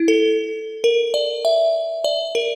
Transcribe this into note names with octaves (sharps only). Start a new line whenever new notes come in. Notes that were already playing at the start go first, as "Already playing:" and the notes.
Already playing: E4
A4
A#4
D5
E5
D5
A#4